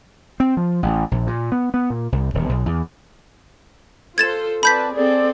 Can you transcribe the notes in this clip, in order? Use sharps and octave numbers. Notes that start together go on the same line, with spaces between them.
C4
F3
A1
A#1
A#2
B3
B3
A#2
C2
D#1
B1
E2
F4 A4 C5 G#6 A6 E7
C4 B4 D5 A5 B5 G6 B6
C4 G#4 A4 D5